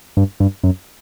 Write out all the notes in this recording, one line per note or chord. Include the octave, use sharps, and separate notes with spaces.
G2
G2
F#2